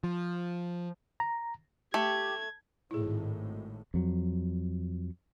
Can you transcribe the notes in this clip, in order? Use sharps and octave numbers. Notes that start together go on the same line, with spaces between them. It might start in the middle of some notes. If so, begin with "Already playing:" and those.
F3
A#5
A3 G4 G#6
G#1 A2 E4 G#4
F2 F#3